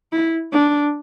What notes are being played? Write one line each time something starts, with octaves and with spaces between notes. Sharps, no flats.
E4
D4